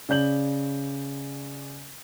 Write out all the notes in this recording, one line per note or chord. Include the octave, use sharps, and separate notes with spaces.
C#3 D5 G6 F#7